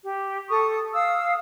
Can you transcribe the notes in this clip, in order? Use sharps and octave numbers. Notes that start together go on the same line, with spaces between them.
G4
A4 C#6 D#6
F5 D#6 E6